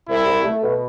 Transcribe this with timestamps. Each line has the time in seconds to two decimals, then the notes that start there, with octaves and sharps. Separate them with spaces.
0.09 C2 E4
0.27 C2
0.45 A3
0.63 B2